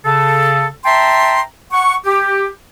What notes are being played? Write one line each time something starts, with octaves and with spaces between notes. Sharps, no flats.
C#3 A4
E5 G5 A5 A#5 C6
F#5 C#6
G4